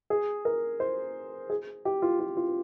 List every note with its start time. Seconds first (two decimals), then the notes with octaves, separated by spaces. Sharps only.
0.10 G#4
0.45 A#4
0.80 C5
1.50 G#4
1.85 G4
2.02 F4
2.20 F4
2.37 F4